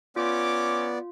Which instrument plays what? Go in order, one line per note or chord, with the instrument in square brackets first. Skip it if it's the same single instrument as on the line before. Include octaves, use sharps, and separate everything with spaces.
[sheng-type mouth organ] B3 D5 [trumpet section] C#4 D6 [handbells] F4